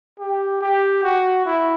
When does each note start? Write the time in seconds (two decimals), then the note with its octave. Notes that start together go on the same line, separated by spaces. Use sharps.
0.19 G4
0.61 G4
1.03 F#4
1.46 E4